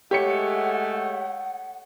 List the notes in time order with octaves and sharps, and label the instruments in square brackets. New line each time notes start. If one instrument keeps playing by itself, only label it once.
[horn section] G#3 A3 [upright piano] G4 C#5 C#7 [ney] F#5